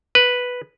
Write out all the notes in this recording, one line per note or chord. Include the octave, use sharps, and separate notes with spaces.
B4